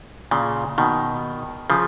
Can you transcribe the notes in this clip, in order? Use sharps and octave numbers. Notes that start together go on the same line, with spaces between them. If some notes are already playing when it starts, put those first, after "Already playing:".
A#2 C#3
B2 D#3
C#3 F3